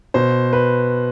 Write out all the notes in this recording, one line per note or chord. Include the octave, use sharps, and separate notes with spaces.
B2 C5
B4